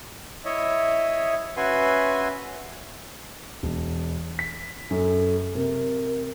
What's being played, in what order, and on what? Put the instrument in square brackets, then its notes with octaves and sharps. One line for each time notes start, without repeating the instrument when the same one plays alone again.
[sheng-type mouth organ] E4 C#5 D#5 E5
C#4 F#4 B4 E5 G#5 C6
[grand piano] E1
B6
[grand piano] F#2 [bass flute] A4
[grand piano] C3 [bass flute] A#4